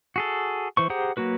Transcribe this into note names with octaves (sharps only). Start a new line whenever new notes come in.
F#4 G#4 A4
E3 C5 C#6
G4 G#4 C5 F#5 A#5
F#3 A#3 F#4 B4